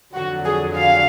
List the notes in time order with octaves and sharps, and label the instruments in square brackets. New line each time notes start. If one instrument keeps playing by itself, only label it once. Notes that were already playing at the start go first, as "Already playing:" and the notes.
[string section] F2 D3 F#3 F#4
G#4
F5